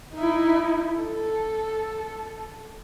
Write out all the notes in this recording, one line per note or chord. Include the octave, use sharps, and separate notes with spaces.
D#4 E4
A4